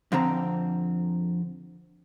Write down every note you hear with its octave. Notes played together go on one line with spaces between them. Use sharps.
F2 D3 C4 A#5